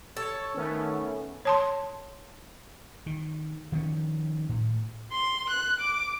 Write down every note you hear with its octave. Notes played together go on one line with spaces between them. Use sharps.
A4 C#5
D#3 A3 B3 C#4
C#5 A5 C6
D#3
D#3 F3 G3 C#4
A2
C6
F#6
D6